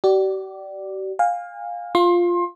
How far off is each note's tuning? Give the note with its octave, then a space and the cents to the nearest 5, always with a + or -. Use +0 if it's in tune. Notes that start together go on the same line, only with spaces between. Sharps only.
G4 -45 D5 +0
F5 +15 G#5 -35
F4 +0 C6 +25